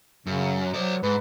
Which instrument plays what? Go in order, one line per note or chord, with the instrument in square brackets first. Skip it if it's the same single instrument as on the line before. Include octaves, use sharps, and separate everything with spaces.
[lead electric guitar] F#2 [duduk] C#3
[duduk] F#3 [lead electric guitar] C5 D5
[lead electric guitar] G#2 [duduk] B4